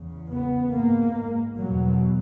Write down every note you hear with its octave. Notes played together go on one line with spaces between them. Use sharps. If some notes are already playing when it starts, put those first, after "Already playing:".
Already playing: E2 C#3
B3
G#2 A#3
E2 B2 F#3